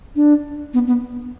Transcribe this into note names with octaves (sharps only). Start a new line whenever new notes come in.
D4
B3
B3